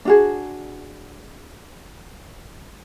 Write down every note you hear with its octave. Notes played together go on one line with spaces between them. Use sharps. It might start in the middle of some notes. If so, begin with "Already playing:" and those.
D4 F#4 G#4